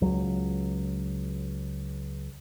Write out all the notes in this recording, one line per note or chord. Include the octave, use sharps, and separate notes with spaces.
C#2 F#3